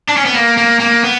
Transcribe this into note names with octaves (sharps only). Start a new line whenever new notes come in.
D4
C#4
B3
A#3
A#3
A#3
B3